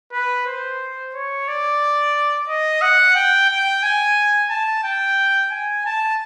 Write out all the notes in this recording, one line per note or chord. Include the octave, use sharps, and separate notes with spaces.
B4
C5
C#5
D5
D#5
F#5
G5
G5
G#5
A5
G5
G#5
A5